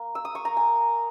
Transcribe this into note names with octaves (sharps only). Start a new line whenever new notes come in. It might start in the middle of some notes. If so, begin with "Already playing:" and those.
Already playing: A#3
E6
D#6
C#6
A#5
G#5